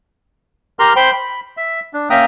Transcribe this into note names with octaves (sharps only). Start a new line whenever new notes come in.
G4 A#4 A#5 C6 F6
C5 G5 B5 C6
B5
E5
D4
A#3 C#4 E5 G5 A#5 D#6